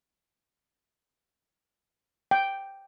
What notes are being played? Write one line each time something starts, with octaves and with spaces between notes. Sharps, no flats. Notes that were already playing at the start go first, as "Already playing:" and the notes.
G5